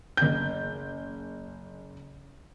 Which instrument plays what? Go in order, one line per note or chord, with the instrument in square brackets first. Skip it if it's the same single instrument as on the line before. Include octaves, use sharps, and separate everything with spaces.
[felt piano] F#1 G6